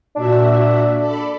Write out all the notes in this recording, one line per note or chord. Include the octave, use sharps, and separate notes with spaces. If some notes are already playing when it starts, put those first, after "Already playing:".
A#2 D4 F#4 E5
A4 D5 B5